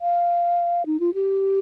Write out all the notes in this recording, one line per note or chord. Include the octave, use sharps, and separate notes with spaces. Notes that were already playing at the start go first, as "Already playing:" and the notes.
F5
D#4
F4
G4